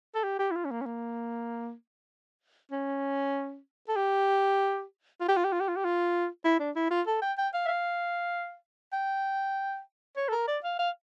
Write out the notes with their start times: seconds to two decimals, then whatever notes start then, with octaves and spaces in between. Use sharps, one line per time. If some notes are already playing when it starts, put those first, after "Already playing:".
0.15 A4
0.23 G4
0.39 G4
0.51 E4
0.56 F4
0.65 C#4
0.71 A#3
0.82 C#4
0.86 A#3
2.72 C#4
3.89 A4
3.96 G4
5.21 F4
5.28 G4
5.37 F4
5.44 G4
5.52 F4
5.60 G4
5.68 F4
5.76 G4
5.84 F4
6.45 E4
6.60 D4
6.76 E4
6.91 F4
7.07 A4
7.22 G5
7.38 G5
7.54 F5
7.65 E5
7.68 F5
8.93 G5
10.16 C#5
10.28 A4
10.32 A#4
10.48 D5
10.64 F5
10.79 F5